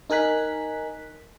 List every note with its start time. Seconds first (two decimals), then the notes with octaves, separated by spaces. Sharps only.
0.10 D#4 A#4 G#5 F#6 B6